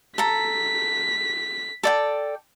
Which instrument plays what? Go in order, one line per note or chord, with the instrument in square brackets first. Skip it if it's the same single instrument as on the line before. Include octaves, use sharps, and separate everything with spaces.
[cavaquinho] A4 A#5 [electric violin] B6
[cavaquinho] A4 D5 G5